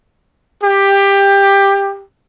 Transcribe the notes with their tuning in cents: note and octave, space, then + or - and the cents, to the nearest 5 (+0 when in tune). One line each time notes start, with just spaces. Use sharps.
G4 +15